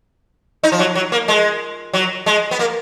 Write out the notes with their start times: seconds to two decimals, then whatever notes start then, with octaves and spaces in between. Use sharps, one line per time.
0.63 D#4
0.72 F3
0.79 F#3
0.95 F#3
1.12 A#3
1.28 G#3
1.93 F#3
2.26 G#3
2.51 B3
2.59 A#3